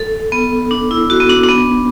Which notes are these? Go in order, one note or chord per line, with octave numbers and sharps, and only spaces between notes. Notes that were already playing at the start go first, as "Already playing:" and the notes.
Already playing: A4
B3
D4
E4
F#4
B3
D4
D4
B3